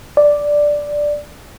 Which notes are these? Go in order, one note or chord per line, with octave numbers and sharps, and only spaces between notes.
D5